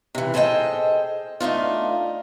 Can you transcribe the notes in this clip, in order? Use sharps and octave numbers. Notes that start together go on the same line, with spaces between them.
C3 E3
G#4 A4 C5 D#5 G5
A3 D4 D#4 F4